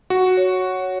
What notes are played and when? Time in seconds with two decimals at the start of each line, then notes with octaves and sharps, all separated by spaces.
0.10 F#4
0.37 C#5